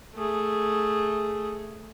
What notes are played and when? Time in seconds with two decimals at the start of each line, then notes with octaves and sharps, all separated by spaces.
0.15 A3 G#4